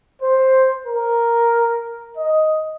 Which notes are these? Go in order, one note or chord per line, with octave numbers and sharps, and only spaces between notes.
C5
A#4
D#5